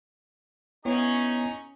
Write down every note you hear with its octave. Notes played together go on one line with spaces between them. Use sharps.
B3 C#4 D#4 E4 G#4 C#5 C#6